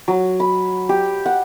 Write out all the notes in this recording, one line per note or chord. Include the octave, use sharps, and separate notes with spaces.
F#3
B5
G4
F#5